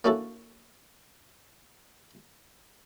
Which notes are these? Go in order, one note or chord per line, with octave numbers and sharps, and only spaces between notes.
A#3 C#4 D4 E4 F#4 A4